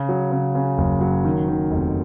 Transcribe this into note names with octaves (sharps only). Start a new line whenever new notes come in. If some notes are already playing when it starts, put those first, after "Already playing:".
Already playing: C#3
F#3
C#3
C#3
F#1
F#3
D#3
D#3
F1